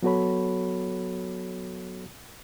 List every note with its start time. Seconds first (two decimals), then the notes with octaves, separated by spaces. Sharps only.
0.02 F#3 B3 F#4 A4 C#5 B5